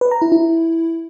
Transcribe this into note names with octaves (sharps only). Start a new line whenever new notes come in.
B4
A#5
E4
E4